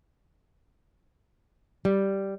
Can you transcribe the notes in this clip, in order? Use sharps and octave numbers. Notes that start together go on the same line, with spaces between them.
G3